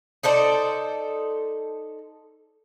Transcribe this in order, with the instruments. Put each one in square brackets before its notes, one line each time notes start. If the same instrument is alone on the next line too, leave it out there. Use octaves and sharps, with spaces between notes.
[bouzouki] D#4 A4 C5 D5